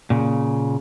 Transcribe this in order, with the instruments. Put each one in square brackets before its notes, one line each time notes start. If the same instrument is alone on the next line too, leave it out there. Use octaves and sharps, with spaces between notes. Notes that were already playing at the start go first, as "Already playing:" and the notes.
[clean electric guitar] A#2 C#3